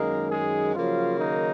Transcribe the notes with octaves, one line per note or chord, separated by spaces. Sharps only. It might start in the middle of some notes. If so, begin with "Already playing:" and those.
Already playing: F#2 D#3 G#3 A#3 A#4
G#3 G#4
C#3 F3 F#3 A#3 F4
D#3 D#4